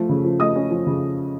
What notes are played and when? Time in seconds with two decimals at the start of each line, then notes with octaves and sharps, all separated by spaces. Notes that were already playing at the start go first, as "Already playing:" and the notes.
Already playing: F3 A3
0.09 C#3
0.25 F3
0.40 A3 D#5 D#6
0.56 C#4
0.70 F3
0.87 C#3